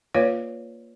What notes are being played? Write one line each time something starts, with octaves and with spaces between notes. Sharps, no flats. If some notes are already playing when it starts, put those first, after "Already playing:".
A#3 F4 B4 C#5 D5 F5